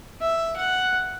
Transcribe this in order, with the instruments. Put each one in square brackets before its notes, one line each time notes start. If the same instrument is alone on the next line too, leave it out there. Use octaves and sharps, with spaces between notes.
[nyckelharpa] E5
F#5